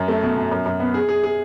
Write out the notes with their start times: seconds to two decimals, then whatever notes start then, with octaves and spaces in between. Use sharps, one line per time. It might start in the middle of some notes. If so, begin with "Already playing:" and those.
Already playing: F#2
0.08 A3
0.23 B2
0.36 B2
0.51 F#2
0.66 F#2
0.80 B3
0.94 G#4
1.09 G#4
1.23 G#4